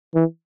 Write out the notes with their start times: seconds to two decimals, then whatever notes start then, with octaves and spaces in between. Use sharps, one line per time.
0.15 E3